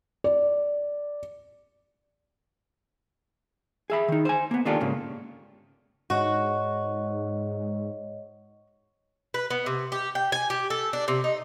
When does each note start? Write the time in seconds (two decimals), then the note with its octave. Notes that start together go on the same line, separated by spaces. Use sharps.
0.24 D5
3.90 G#4 E5 B5
4.08 D#3 D#4
4.25 C5 G#5
4.51 A#3 B3
4.65 D#3 A#3 D4 F4 G4 A4
4.80 G#2 C#3 A#3
6.10 G#2 F#4 C#5 D#5
9.34 B4
9.50 B3
9.66 C3
9.92 G4
10.15 G5
10.32 G#5
10.50 G4
10.70 A4
10.93 D4
11.08 C3
11.24 D#4